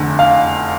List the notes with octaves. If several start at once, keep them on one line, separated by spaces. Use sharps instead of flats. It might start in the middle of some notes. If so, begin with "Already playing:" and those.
Already playing: F1 E2 D3
F5